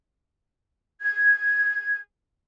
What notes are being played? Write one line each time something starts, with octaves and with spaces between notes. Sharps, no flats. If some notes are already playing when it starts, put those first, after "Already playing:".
G#6